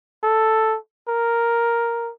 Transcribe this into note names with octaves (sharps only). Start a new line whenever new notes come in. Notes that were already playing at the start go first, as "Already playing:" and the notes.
A4
A#4